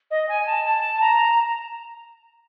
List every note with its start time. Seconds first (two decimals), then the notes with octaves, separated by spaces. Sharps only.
0.11 D#5
0.29 G#5
0.46 A5
0.65 A5
1.01 A#5